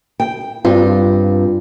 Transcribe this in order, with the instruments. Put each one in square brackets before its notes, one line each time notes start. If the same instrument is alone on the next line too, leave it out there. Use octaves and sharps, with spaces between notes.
[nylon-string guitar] G5
[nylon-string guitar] G2 [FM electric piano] C4 F4